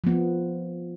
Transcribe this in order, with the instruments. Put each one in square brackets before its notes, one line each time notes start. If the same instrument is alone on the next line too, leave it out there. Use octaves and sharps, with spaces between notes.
[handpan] F3 B3